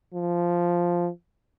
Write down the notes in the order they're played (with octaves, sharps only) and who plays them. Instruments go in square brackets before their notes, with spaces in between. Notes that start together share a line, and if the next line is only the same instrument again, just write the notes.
[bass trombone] F3